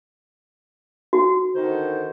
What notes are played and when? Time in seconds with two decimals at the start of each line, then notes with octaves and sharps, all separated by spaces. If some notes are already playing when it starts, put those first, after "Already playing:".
1.13 F#4
1.55 D3 D#3 C5